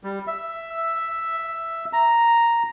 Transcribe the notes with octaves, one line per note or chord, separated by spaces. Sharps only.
G3
E5
A#5